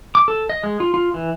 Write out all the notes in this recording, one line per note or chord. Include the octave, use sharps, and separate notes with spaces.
D6
A4
D#5
G#3
F4
F4
E3